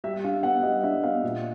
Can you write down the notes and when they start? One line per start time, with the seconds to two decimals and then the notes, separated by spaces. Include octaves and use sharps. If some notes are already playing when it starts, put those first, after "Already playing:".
0.04 G3 E5
0.14 E5
0.24 D4 F5
0.43 B3 F#5
0.63 G3 D#5
0.83 D4 E5
1.03 B3 F5
1.23 A#2